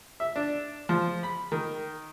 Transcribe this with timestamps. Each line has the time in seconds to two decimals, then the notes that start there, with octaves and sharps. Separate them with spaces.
0.20 E5
0.36 D4
0.89 F3
1.23 B5
1.52 D#3